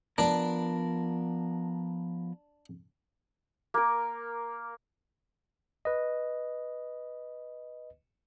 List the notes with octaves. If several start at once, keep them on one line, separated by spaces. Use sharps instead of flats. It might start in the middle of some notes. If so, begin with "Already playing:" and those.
F3 B3 D4 A#4 D5
A#3 A#4
B4 D#5